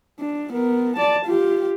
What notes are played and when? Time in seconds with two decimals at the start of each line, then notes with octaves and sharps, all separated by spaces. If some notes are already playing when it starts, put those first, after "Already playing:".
0.20 D4
0.53 B3 A#4
0.96 D5 A5
1.25 F4 G4